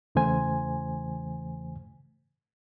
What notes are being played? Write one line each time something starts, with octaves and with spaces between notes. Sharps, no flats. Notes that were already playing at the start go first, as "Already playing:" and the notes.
E2 C#3 E3 A3 C5 G#5